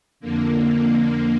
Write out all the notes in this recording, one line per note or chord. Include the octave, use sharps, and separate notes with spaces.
F2 D3 A#3
A#3